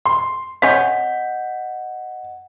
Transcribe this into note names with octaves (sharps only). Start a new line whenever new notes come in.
C6
C4 C#5 D#5 F#5 G#5 G6 B6